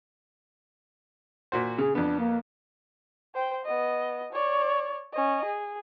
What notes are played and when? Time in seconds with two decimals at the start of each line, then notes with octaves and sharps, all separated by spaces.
1.52 A#2 F#4 C5
1.78 C#3 G#4
1.95 F2 B3 D4
2.19 A#3
3.35 C5 G5
3.65 B3 D#5
4.33 C#5 D5
5.13 C#4 D#5
5.45 G#4